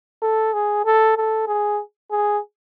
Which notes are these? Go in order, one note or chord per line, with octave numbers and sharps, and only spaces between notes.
A4
G#4
A4
A4
G#4
G#4